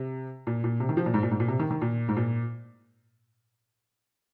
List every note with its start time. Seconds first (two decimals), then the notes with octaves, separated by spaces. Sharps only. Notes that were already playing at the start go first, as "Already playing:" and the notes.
Already playing: C3
0.47 A#2
0.64 A#2
0.80 C3
0.89 D#3
0.97 F3
1.06 A#2
1.14 G#2
1.23 A#2
1.31 G#2
1.40 A#2
1.48 C3
1.60 D#3
1.71 D#3
1.82 A#2
2.08 G#2
2.17 A#2